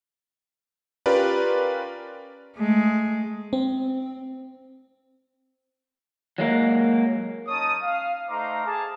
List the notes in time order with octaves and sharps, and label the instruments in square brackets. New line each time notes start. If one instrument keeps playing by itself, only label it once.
[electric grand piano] C#4 F4 G4 A#4 B4 D5
[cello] G#3 A3
[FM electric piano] C4
[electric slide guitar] F#3 G#3 A#3
[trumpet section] C#4 D#4 C#5 A5 D#6
F5
A3 D#4 C5 F5 A#5 D6
G#4 A5